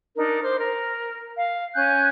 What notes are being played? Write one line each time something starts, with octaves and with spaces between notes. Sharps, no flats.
D4 D#4 A#4
C5 D6
A#4
F5
C#4 G#5 F#6 G6